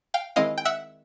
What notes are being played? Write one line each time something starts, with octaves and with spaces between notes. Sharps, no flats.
F5 G5
D#3 G#3 C4 E4 D#5 F5
G5
E5 F#5